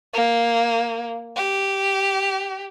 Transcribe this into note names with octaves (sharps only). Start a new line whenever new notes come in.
A#3
G4